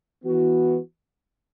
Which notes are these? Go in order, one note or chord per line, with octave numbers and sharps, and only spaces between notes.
E3 B3 F#4